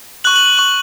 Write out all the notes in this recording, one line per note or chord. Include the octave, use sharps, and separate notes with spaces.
C#6 F#6 F#7
F#7
F#7
C#6 F#6 F#7